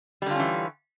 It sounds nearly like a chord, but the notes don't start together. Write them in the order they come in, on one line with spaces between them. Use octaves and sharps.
G3 D3 F4 C#4 E3